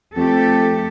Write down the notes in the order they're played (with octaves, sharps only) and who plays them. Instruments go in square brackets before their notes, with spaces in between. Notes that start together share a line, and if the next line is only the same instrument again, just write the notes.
[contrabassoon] F2 [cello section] A3 G4 A4